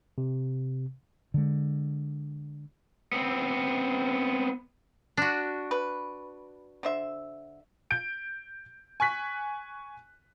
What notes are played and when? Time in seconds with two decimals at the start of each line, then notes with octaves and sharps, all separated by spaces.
0.18 C3
1.34 D3 G#3
3.12 B3 C4
5.17 D4 F#4
5.71 B4
6.83 D3 C5 E5
7.91 G6 D7
9.00 G#5 C#6 F#6 B6